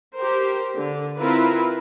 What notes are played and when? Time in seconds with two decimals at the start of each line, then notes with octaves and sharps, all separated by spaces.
0.14 G4 A#4 C5
0.77 D3
1.19 C4 E4 F4 A#4 B4